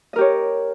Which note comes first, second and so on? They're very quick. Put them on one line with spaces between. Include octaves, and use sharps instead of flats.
D#5 A#4 G4 C#5